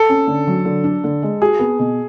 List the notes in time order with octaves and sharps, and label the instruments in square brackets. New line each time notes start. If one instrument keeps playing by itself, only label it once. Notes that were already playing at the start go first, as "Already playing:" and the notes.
Already playing: [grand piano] A4
[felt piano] C#4
D3
F#3
D3
D4
D3
G#3
[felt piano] F#4 [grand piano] G#4
[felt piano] B3
B2